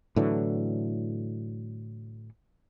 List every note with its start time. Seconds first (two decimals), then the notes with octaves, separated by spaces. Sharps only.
0.16 A2 D3 E3 F#3